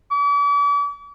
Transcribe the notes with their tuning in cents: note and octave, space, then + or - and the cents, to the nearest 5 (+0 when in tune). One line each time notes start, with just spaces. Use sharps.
D6 -40